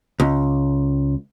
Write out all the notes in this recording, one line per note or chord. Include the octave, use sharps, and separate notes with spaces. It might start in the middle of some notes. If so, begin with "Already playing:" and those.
C#2